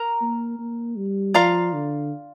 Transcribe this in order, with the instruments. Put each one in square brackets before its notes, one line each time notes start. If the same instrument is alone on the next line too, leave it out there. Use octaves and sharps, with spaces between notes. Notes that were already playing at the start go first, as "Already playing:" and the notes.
Already playing: [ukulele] A#4 A#5
[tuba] A#3
A#3
G3
[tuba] F3 [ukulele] F4 D5 F5 A#5
[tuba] D3